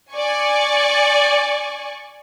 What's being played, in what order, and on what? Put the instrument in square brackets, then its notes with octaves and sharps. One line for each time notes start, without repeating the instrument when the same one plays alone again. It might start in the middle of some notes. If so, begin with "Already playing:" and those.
[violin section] D5 G#5 C#6